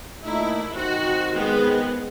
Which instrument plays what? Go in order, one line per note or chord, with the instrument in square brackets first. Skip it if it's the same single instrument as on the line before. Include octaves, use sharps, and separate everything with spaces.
[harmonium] A#2 A3 D#4 [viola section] E4
[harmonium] D#3 C4 [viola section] F#4
[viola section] G#3 B3